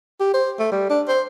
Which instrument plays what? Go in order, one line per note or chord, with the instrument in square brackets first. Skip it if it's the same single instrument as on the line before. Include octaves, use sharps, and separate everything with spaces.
[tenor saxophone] G4
C5
A3
G3
D4
C5